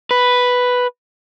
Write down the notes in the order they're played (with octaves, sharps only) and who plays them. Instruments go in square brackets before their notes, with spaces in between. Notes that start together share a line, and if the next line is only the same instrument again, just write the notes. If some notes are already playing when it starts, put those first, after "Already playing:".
[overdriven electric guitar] B4